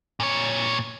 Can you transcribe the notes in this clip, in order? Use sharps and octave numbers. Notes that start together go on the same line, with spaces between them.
A#2 C#5